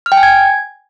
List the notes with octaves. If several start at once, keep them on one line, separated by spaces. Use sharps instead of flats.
F6
G5
G#5
G#6